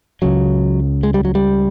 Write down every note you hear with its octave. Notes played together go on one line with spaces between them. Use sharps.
C#2 C#3 F#3
G#3
G3
F#3
G3